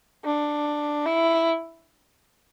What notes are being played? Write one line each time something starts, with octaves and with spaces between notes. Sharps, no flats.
D4
E4